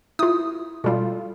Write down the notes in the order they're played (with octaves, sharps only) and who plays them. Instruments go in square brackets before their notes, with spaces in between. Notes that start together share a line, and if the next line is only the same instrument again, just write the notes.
[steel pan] E4 [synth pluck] F4 D#6
[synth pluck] B2 G3 [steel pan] F4 A4